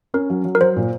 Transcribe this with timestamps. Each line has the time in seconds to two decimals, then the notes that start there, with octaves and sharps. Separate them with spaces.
0.14 C#4 A#4
0.30 F#3
0.45 F#3
0.55 A#4
0.61 F#3 C5
0.76 A#2